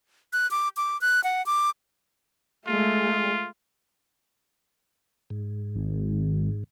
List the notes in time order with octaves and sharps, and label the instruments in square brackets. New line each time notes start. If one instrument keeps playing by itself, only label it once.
[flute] F#6
D6
D6
F#6
F#5
D6
[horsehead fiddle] G#3 A3 [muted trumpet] F4
[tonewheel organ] G#2
[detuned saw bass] G#1